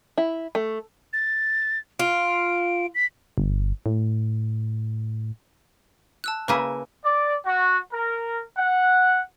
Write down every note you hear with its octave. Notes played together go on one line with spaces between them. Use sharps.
E4
A3
A6
F4 D7
B6
G1
A2
A5 E6 F#6
C#3 A#3 E4 B4 G#5
D5
F#4
A#4
F#5